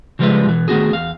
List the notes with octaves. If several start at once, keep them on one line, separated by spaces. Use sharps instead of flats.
C#3 F3 G3 G#3 B4 E5
B2 E3
D#3 A3 B3 F#4 G#4
E2 F5